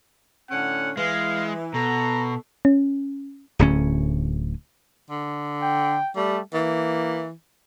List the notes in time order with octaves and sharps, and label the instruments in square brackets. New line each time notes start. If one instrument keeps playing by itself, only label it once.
[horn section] A2 D3 C#4 [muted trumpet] F#5
[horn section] E3 [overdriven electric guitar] G#3 [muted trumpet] F5
[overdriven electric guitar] B2 [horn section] A4 [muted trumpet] A#5
[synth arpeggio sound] C#4
[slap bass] D1 D2 C#4
[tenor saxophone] D3
[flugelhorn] G5
[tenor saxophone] G3 [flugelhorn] A3
[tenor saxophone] E3 [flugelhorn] A#3